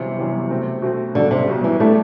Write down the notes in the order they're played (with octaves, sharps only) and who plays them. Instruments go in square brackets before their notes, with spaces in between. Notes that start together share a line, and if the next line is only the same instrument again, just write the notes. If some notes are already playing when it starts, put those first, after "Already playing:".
Already playing: [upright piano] G1 F#2 E3 G3 [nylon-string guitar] C3
[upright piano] G1 F#2 E3 G3
B2 A3 C4
B2 A3 C4
[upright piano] B1 B2 G3 [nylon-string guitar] D3
[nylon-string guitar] C3
[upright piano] B1 B2 G3
[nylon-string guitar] E3
[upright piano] A2 G3 D4 [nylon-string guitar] A3